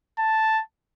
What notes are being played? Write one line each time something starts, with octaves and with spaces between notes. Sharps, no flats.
A5